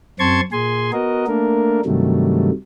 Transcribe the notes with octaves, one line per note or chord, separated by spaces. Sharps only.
F#2 C4 A5 C6 C#6 G#6
A#2 G#4 G#5 C6
B3 F#4 A#4 D#5
A3 A#3 D4 A#4
G2 C3 D#3 F#3 G3 A3